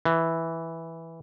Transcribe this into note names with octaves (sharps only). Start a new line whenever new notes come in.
E3